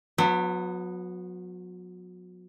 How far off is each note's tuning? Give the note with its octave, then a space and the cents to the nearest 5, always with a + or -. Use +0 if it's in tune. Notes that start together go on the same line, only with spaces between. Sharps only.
F#3 -35 B3 +0